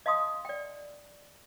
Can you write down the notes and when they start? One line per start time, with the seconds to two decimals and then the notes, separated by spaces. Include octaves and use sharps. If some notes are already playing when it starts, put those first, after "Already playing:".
0.06 D#5 F5 A5 C6 D#6
0.45 D5 G5